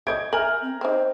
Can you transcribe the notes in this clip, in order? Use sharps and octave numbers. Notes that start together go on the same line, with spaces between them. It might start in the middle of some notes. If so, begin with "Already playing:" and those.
A3 C#5 D#5 G6 G#6 D7
A#4 E5 G#5 A#5 F6 F#7
C4
C4 D#4 C5